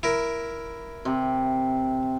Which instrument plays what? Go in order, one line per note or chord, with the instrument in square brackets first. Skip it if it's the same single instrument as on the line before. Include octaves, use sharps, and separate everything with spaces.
[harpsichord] E4 A#4
[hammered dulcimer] C3